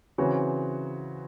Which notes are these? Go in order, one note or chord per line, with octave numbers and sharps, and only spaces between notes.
C#3 E3 C4 F#4 C#5